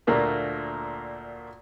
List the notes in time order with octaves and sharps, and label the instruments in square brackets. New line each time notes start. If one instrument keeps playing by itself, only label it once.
[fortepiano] D2 A#2 A3 A#3 D4